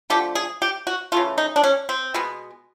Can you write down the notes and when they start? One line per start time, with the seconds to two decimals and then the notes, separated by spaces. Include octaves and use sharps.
0.10 D3 F3 A3 G4
0.35 G#4
0.62 G4
0.87 F#4
1.12 C#3 E3 A3 F4
1.38 D#4
1.56 D4
1.64 C#4
1.89 C4
2.14 B2 G#3 B3